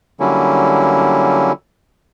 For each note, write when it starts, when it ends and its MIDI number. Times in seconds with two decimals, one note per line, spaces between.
0.20 1.52 50
0.20 1.52 54
0.20 1.52 55
0.20 1.52 58
0.20 1.52 61
0.20 1.52 64